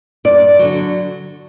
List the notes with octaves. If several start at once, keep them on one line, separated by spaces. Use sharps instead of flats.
G2 D5
D3 F#3